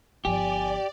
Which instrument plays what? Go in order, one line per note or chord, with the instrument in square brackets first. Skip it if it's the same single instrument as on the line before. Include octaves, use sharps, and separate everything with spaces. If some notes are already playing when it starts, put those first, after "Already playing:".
[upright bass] G1 F3 [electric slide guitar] G4 [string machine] D5 [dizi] G#5